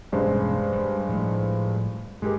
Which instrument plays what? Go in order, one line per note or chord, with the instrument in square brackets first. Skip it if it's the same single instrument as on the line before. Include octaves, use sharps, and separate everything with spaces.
[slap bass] E1 C#4 [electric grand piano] G2 G#3 C5
[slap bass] G3
A2 F3 A3
[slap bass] G2 [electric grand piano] G#3 G4 A#4